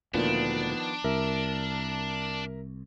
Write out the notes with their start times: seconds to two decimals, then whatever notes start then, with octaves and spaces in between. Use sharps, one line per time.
0.14 D2 A#2 D#3 F3 B3 D4
1.04 C2 A#4 E5